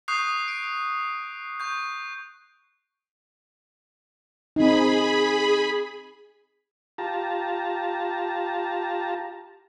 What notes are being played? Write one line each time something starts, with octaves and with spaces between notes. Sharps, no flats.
C#6 D#6 F#6 G6 C7
D7
C#6 G6
C4 D#4 G#4 B5
F4 G4 A5 A#5